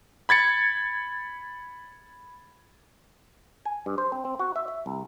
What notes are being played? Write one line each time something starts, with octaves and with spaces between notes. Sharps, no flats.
B5 G#6 A6 C#7
G#5
G2
C5
C4
C4
F#4
E5
E5
C2